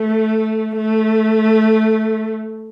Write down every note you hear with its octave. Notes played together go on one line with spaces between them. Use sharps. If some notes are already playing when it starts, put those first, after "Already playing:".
Already playing: A3
A3